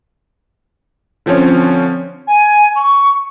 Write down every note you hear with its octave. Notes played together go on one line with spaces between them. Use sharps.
D3 F3 C4 C#4 C#5
G#5
C#6